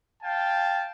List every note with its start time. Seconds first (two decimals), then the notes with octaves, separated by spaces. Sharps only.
0.23 F5 G5 A5